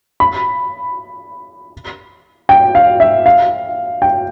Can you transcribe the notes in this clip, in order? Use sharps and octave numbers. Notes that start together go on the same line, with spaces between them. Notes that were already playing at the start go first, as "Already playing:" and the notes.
B5
G5
F5
E5
F5
G5